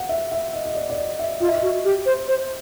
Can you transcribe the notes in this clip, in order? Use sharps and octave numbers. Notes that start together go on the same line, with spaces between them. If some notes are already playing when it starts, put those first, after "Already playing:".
Already playing: F5 F#5
E5
E5
D#5
D#5
D5
D5
D#5
E5
F4 D#5
E5
D#5
F#4
G4
C5
C5